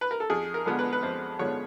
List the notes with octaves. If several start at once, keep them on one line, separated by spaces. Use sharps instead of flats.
B4
A#4
A4
F2 G#4
A#4
D3 F3 G#3 B3
B4
B4
F2 C5
D3 F3 G#3 B3 C#5